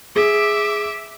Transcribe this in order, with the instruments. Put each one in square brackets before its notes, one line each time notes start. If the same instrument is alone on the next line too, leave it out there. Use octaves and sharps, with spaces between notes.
[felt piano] G#4 [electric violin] E5 D6